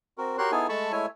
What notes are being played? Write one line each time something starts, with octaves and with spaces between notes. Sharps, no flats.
C4 F#4 A#4
F#4 G4 A#4 C#5 C6 F#6
B3 D#4 E4 G#4 A4 G#5
G#3 A3 A4 A5 B5 C#6
G#3 A3 E4 C#5 E5 G#5